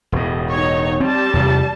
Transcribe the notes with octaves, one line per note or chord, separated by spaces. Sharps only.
E1 A2
D#4 C#5
G3 C4 A5
E2 C3